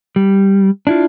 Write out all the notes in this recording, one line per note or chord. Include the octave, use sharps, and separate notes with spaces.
G3
D4 E4 F4